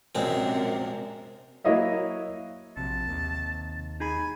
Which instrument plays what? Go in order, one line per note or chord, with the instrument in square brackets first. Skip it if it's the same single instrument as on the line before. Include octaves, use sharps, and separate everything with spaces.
[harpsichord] A#1 G#3 C4 [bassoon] F#2 [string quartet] C3 A#4
[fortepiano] F#3 A#3 E4 C#5 D#5 E5
[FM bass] A#1 [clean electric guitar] C3 [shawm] A5
[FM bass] D#2
[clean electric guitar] D#4 G#4 B5 [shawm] G#5